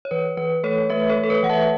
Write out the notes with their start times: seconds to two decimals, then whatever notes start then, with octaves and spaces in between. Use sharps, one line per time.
0.05 C#5
0.11 E3 B4
0.37 E3 B4
0.63 A3 A4 C#5
0.90 A3 B4 E5
1.09 A4 C#5
1.16 A3
1.23 A4
1.30 B4
1.43 E3 F#5
1.49 E5 A5